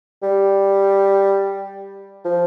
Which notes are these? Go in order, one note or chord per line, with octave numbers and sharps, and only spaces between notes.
G3
F3